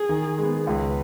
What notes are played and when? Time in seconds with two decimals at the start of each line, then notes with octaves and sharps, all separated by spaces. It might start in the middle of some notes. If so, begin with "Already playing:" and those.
Already playing: G#4
0.09 D#3
0.38 G#3 B3
0.67 C#2 B4